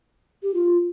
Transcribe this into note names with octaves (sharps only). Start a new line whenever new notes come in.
G4
F4